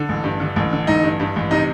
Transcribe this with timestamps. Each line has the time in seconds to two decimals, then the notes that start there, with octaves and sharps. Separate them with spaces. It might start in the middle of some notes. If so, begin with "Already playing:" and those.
Already playing: D3
0.09 A1
0.24 G2
0.40 D3
0.56 A1
0.72 D3
0.87 A1 D#4
1.03 G2
1.20 G2
1.36 A1
1.51 C3 D#4